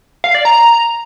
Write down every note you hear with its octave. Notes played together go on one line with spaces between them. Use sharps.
F5
D5
A#5